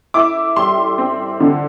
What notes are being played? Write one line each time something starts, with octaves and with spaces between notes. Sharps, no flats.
E4 D6
G3 C6
C4
D3